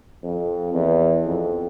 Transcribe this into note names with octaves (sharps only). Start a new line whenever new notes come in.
F2
E2
F2